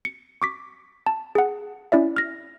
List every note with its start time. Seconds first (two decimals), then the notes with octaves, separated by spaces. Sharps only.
0.05 C#7
0.42 C#6 D6 B6
1.06 A5
1.35 G#4 F#5
1.92 C#4 E4 D5 E5
2.16 F6 A#6